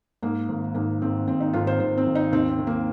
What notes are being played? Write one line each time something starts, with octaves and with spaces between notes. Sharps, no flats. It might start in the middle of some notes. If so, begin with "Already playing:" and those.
G#2 A#3
G#1
G#2 A#3
G#1 C4
G#1 C4
D#4
G#1 F4
C5
G#1 C5
C4
G#1
D#4
D#2 C4
C4
D#3
A#3